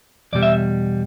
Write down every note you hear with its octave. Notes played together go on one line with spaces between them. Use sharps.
E2 B2 G3 D5
E5